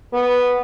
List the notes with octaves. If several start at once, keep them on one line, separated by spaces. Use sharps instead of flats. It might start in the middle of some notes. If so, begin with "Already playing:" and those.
B3